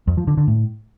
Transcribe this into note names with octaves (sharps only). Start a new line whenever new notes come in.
F2
F3
D3
D3
A2